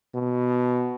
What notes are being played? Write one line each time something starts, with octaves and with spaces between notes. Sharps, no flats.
B2